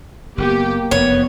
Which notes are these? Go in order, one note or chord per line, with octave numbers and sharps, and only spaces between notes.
F#1 C3 A#3 B3 G4
F1 F#2 B3 C#5